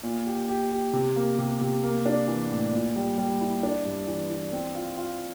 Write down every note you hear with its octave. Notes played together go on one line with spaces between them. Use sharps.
A#2
G4
G4
G4
C3
A#3
C3
C3
A#3
D4
E3
A2
A#2
G3
G3
E4
D4
G2
E3
E3
C4
F4
F4